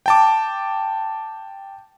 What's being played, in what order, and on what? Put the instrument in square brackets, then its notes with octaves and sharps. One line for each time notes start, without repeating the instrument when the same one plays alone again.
[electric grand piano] G5 A5 D6